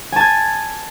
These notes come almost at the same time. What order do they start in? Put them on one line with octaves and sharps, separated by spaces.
G#5 A5 G#6